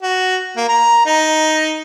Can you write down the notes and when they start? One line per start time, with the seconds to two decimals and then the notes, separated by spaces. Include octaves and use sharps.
0.02 F#4
0.56 A#3
0.68 A#5
1.06 D#4